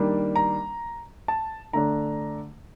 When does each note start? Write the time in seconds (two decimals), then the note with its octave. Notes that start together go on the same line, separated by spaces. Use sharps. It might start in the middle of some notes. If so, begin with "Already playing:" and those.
Already playing: D#3 G3 A#3 D4
0.36 A#5
1.28 A5
1.73 D3 A3 D4 A#5